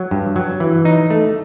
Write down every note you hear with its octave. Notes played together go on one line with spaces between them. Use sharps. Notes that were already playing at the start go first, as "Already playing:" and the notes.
Already playing: F#3
G2
F#3
E3
D#4
A3